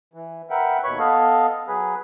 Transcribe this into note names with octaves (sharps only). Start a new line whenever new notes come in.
E3
A#4 B4 E5 F#5 G5
D#2 B2 B4 C#5 B5 C#6
B3 A4 D#5 F5
F#3 G#4 B4